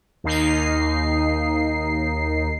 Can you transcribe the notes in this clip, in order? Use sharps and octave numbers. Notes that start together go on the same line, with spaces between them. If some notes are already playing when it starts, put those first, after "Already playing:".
D#2 D#4 C7